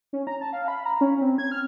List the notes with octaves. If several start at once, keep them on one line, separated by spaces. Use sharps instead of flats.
C#4
A#5
A5
F5
B5
A#5
C#4
C4
G#6
F6